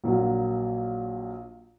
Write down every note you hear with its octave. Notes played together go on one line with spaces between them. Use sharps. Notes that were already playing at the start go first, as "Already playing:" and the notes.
A#1 A#2 F#3 A#3